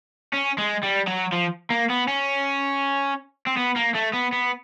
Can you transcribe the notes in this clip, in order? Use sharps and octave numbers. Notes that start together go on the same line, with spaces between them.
C#4
G#3
G3
F#3
F3
A#3
B3
C#4
C4
B3
A#3
A3
B3
B3